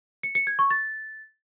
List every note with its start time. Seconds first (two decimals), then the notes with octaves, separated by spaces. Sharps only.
0.23 C#7
0.35 C#7
0.47 G#6
0.59 C#6
0.71 A6